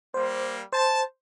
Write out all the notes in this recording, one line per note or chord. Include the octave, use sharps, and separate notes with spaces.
G3 A#3 C5
C5 A5